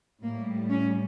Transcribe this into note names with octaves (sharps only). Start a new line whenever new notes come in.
A2 G3 A#3
C#4